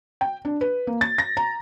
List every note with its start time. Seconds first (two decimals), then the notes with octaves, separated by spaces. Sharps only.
0.21 G5
0.45 D4
0.61 B4
0.87 A#3
1.01 A6
1.18 A#6
1.37 A#5